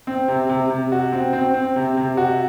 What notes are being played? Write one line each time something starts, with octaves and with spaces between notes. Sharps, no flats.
C4
C3
C3
C3
F#4
C4
C4
C4
C3
C3
F#4